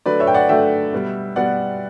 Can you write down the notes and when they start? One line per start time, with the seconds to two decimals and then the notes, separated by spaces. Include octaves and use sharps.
0.06 D3 F#3 A3 B4 D5
0.20 C#5 E5
0.27 G5
0.34 D5 F#5
0.49 D3 F#3 A3 E5 G5
0.93 B2 G3 B3
1.36 B2 G3 B3 D5 F#5